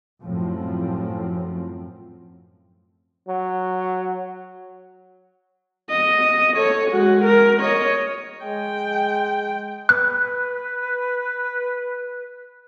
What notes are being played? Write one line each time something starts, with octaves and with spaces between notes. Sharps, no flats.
F#2 A2 F3 C4
F#3
D#5
A4 C#5
G#3 F#4
A#4
C#5 D#5
G#3 G5
B4 F#6